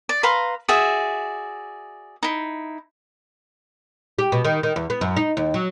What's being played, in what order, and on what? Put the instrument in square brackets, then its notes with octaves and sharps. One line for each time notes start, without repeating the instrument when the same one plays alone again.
[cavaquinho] D5
B4 F5 A#5 C6
F#4 G#4 D5 E5
D#4 E4
[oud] G4
B2
D#3
D#3
E2
B3
F#2
D#4
D#2
F#3